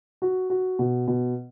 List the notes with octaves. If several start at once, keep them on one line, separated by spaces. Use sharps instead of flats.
F#4
F#4
B2
B2